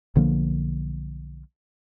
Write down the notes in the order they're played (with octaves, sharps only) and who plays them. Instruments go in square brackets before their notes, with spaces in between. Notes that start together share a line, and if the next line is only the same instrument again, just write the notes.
[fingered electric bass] B1 D3 F3 A#3